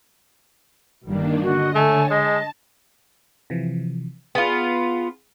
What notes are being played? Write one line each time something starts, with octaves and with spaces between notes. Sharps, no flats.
G1 D#3 G3 A#3 D4
D3 F#4 D#5
A3 C#5 G#5 A5
G#3 D#5 A5
C3 E3 F3
B3 F4 G#4